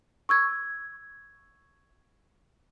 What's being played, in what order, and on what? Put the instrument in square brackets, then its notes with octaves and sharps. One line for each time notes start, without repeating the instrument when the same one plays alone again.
[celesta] C#6 E6 G#6